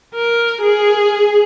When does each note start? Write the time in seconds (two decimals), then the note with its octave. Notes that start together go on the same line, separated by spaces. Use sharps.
0.15 A#4
0.62 G#4